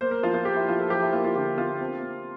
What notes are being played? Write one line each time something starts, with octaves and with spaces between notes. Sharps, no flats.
A#3 C5
A#4
F3 F4
F4
A#3 G4
E4
F3 F4
A4
F3 G4
E4
A#3 F4
F4
D3 G4
A#3 F4
C4
C4